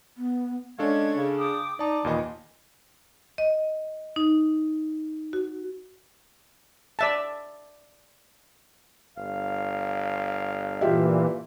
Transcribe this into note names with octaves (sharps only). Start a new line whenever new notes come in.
B3
G#3 C#4 D4 A4 F5 C#6 G#6
C#3
G5 D6 D#6
D#4 D5 A5 D6
D#2 A#2 E3 D#5
D#5
D#4
F#4
D5 E5 A5
G1 F5
A#2 E3 F4 G4 E5